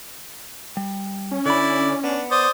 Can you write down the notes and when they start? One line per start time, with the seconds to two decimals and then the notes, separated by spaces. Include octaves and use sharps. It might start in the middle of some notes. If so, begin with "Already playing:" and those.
0.77 G3
1.31 C#4
1.46 D3 E4 D5 B5
2.04 B3 D4
2.31 C5 D5 D#6